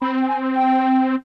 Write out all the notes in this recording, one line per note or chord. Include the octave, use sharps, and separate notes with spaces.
C4 B5
G5
G#5
G5